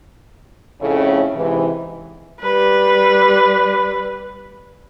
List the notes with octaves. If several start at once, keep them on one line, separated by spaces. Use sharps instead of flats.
F2 A2 C#3 A3 C#4
G#2 C3 E3
G3 B4